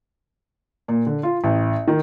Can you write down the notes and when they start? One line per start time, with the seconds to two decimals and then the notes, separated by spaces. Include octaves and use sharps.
0.88 A#2
1.07 D3
1.23 F4
1.44 A1
1.88 D#3